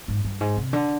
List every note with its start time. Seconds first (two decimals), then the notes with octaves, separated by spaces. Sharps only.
0.08 G#2
0.24 G2
0.41 G#2
0.57 C3
0.73 D3